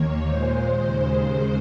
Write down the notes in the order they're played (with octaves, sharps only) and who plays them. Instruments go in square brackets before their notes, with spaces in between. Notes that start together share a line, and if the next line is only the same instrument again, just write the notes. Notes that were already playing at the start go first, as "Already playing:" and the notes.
Already playing: [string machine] D#2 D#3 A#3 C#5
A#2 G#3 C5
D#2 C#3 G#3